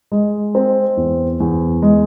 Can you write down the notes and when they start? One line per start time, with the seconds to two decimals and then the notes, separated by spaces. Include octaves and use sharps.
0.12 G#3
0.55 C4
0.97 E2
1.40 E2
1.82 G#3